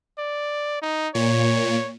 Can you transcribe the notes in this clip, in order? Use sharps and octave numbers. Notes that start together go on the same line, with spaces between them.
D5
D#4
A#2 C#5